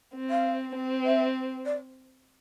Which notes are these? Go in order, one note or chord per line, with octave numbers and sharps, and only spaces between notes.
C4
F5
C4
E5
D5